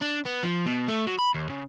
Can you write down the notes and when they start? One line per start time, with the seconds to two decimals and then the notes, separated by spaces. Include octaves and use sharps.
0.01 D4
0.25 B3
0.43 F3
0.66 B2
0.88 A3
1.07 F#3
1.19 B5
1.35 D#2
1.50 C#3